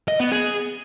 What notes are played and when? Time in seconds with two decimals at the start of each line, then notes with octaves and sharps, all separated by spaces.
0.08 D#5
0.20 B3
0.32 G#4